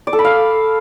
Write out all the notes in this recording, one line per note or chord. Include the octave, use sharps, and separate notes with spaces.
D5
A4
B5
F5